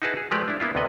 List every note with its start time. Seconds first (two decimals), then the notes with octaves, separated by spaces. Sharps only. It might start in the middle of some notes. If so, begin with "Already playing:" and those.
0.02 D#4 E4 F#4 G#4 B4 A5
0.17 G#4
0.31 F3 G#3 A3 G4 B4 D5
0.48 D4 E4
0.60 A#3 B3 E4 F4
0.75 D2 C3 B3 B4 D#5